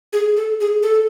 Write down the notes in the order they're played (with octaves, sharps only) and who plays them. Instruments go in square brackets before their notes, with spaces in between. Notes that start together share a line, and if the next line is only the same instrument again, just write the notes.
[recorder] G#4
A4
G#4
A4